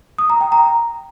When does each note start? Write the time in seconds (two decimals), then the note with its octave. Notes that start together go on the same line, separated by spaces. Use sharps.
0.18 D#6
0.30 A#5
0.41 G5
0.52 A#5